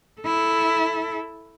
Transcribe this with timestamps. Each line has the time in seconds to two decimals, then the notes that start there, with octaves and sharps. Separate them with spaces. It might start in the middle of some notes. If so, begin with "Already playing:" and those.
0.21 E4 A4